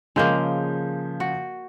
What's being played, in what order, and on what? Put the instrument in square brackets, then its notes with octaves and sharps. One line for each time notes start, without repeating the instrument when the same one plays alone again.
[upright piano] C#3 F3 G6 [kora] G#3 A#3
[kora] F#4